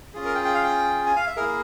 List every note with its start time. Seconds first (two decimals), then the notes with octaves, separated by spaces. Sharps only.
0.14 C#4 F4 G#4
0.25 A#4
0.35 G5
0.45 G5
0.54 F5
0.63 G5
1.06 G#5
1.16 F5
1.27 E5
1.37 A#3 E4 G#4 A#4